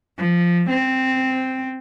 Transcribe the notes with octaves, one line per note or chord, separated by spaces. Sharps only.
F3
C4